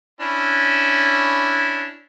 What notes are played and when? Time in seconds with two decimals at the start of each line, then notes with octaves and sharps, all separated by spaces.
0.21 C#4 D4 E4